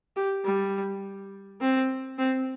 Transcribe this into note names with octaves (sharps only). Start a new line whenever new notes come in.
G4
G3
C4
C4